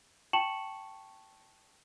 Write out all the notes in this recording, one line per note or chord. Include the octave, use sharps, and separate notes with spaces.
G5 A5 C#6 C#7 E7 F#7